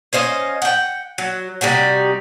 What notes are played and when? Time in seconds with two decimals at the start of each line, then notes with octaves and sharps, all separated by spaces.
0.13 C#4 C5 D#5 F5
0.62 F#5 G5
1.18 F#3
1.61 C3 G3 D#4 F#4